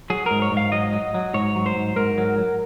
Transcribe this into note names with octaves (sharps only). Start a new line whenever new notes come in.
F#3 G#4
G#2 A#4
C#5
G#2 F5
F#3 D#5
F#3
F#3
G#2 C#5
F#3
C5
G#2
G#2 A#4
F#3
F#3